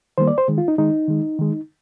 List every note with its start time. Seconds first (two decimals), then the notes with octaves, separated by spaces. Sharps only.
0.18 D#3 G3 A#3 C5
0.27 D5
0.38 C5
0.48 D#3 G#3
0.58 F4
0.68 D#4
0.78 D#3 G#3 D#4
1.08 D#3 G#3
1.39 D#3 G#3